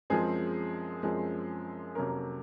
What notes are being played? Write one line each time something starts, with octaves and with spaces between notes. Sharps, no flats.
F#2 F3 G#3 C4 G#4
F#2 F3 G#3 C4
F2 C3 F#3 A#3 C#4 A#4